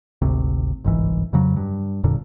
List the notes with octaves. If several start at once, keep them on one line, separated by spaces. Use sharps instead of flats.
G#1 D2 C3
G1 C2 G#2 E3
F2 C#3 F#3
G2
E1 F2 A#2 D3